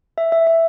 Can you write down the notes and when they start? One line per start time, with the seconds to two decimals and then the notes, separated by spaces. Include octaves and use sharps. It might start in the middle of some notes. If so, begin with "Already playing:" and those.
0.18 E5
0.32 E5
0.47 E5